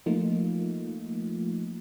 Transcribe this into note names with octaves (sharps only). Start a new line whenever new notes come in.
F3 A3 A#3 D#4 F4